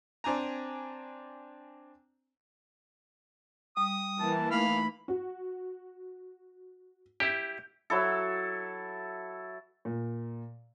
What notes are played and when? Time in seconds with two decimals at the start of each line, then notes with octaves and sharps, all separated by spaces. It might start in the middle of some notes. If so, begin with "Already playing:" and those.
0.24 C4 D4 G#5 A#5
3.77 G3 D#6
4.20 E3 A#3 E4 A5
4.51 A3 D#4 F5 B5
5.08 F#4
7.20 E4 G4 G6
7.90 F#3 E4 A4
9.85 A#2